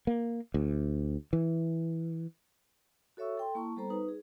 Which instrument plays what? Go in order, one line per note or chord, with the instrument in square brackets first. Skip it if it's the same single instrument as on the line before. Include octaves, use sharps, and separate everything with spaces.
[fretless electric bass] A#3
D2
E3
[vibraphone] F#4 A4 C#5 E5 C#6 E6
A4 G5 C6
A#3 E4 A5 C#6
G3 B3 A4 C5 A#5
D#4 B4
G#4